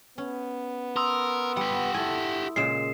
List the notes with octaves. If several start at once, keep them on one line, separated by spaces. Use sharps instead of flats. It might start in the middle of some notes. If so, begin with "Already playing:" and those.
B3 C#4
A#4 C6 D#6 E6
G3 G4 F#5
E4 A4 G#5
A#2 C#3 G#3 C7 E7